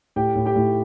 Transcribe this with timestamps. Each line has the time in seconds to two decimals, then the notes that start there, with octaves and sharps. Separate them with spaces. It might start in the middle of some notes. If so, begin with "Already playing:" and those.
0.16 A2 G4 G5
0.35 A2
0.45 G4 G5
0.56 A2